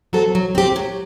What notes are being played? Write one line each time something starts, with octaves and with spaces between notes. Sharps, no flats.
F#3 C4 F#4 A4
F#3
C4 G4
F#3